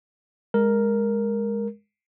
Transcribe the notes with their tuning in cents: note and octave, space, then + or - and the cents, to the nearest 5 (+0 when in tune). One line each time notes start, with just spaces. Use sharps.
G#3 -10 A#4 +0